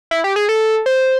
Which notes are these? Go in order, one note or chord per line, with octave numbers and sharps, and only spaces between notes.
E4
G4
G#4
A4
C5